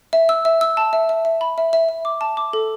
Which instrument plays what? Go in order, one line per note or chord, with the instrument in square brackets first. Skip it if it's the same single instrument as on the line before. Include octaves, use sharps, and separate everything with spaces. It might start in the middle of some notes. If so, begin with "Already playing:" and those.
[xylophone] E5
E6
E5
E6
A5
E5
E5
E5
B5
E5
E5
E5
D6
A5
D6
A4